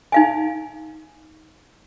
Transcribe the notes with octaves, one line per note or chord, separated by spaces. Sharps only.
D#4 F5 G#5